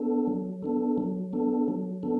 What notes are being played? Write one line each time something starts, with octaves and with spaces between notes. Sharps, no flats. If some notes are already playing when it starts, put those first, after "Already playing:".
Already playing: B3 D4 A4
F#3
B3 D4 A4
F#3
B3 D4 A4
F#3
B3 D4 A4